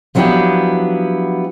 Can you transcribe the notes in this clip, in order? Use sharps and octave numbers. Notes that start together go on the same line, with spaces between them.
F3 F#3 B3 D4 E4 G4